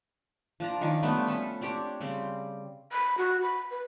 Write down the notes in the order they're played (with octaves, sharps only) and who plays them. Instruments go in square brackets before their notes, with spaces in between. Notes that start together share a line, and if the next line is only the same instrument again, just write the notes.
[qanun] F3 D4 A#5
D#3 C#4 D4 F4
F3 G3 A3 B3
C#4 A4 B4 C#5
C4 D4 G4 C#5
C#3 G3 C4
[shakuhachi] B5
F#4
B5
B4